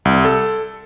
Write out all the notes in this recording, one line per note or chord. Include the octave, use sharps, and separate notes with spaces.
C2
A4